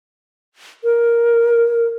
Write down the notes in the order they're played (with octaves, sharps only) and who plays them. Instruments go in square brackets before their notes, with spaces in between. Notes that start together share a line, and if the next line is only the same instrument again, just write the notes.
[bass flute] A#4